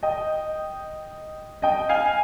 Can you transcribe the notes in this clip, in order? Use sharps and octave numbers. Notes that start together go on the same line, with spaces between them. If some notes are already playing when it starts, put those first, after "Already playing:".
D#5 G5
D#5 G5
F5 G#5